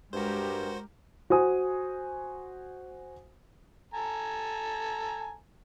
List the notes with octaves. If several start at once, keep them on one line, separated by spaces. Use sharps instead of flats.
G2 G#3 F#4 G4 A#4 C5
F#4 C5 G#5 D#6
A4 G#5 A#5